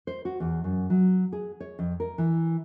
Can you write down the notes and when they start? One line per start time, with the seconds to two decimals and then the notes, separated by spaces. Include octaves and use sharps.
0.07 C5
0.25 F#4
0.40 E2
0.64 F#2
0.90 F#3
1.33 G#4
1.60 C#5
1.79 F2
2.00 A#4
2.18 E3